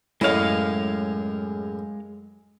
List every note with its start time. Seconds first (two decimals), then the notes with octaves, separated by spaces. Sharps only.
0.21 F#2 A2 G#3 E4 C#5 D#5 F5